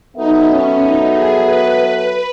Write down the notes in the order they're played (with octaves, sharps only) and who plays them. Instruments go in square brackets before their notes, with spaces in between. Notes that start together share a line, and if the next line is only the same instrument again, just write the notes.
[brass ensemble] F#3 B3 F#4 A4 E5 [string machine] D#4
[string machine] C#4
D#4
G#4
B4